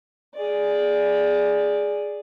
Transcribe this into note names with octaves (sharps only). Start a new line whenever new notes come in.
G#4 D5